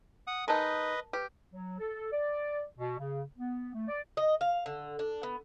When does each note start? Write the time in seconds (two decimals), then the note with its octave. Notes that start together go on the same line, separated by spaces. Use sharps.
0.27 F#5 D#6
0.48 G#3 D#4 A#4 B4 D#5 A5
1.13 G4 B4
1.51 F#3
1.79 A4
2.11 D5
2.77 B2
2.98 C#3
3.37 B3
3.74 A3
3.88 D5
4.17 D#5
4.41 F5
4.66 D3
4.99 D4
5.23 B3